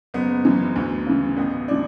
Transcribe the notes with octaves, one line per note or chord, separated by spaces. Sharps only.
F#1 B3
F#2 E3
D2
C#3 E3
A1 B3
E3 D4